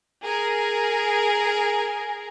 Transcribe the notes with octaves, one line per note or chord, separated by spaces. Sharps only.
G#4 A#4